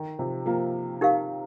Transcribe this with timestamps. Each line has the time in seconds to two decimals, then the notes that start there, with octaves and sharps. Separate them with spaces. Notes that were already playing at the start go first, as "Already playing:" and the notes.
Already playing: D#3
0.19 C3 F3
0.46 F3 A#3
1.01 D#4 G4 A#4 F5